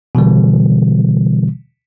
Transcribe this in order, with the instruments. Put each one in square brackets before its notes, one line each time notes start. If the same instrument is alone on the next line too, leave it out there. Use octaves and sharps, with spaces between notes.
[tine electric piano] B2 D3 E3 G3